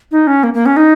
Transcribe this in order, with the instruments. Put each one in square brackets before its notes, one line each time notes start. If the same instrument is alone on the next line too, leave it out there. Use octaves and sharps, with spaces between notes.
[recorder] D#4
C#4
A#3
A#3
C#4
D#4